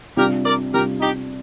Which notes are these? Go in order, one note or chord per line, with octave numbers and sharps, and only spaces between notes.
C3 G3 D4 F4 G4 A#4
A#4 D5
C3 G3 D4 F4 G4 A#4
D#4 G4